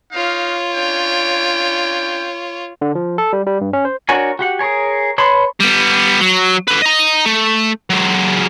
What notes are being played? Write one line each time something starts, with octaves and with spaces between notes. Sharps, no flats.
D#4 F4 C#5 F5
C#4 D4 G5
D3
F3
A4
G3
G3
G2
C#4
C5
D4 F#4 A#4 C#5 G#5
F#4 G4 F#5
G#4 A#4 C#5 G#5
B4 C#5 A5 B5 C6
G3 B3
F#3
D3 B4
D#5 A#5
A3
F#3 G#3